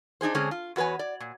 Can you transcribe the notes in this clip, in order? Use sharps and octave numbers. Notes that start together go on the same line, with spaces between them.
D4 D#4 G#4 C5
D3 G#3 C4 C#4 G#4
F4
E2 F#4 B4 C#5 G#5
D5
A#2